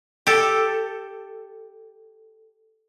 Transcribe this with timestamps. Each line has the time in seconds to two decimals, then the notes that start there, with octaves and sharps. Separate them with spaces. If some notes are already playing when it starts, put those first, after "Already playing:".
0.27 G4 A4